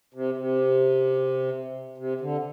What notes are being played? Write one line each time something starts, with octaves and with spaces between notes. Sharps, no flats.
C3
C3
C3
D3